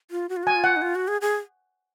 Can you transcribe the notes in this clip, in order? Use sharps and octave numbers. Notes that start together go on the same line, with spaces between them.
F4
F#4
F4
F#4 G#5
F4
F#5
D#4
F4
F#4
G#4
G#4